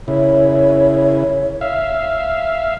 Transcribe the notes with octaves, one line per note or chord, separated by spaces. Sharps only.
C#3 E4 C#5
E5 F5